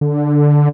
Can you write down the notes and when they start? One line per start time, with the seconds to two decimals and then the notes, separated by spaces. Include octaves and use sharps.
0.01 D3